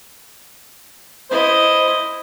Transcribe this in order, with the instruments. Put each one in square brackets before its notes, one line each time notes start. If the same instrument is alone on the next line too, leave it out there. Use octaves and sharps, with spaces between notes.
[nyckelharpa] E4 D#5 [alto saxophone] C5